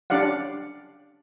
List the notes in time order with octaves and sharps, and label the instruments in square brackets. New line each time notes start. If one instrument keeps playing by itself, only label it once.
[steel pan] C#4 D4 G4 D5 F5 F#5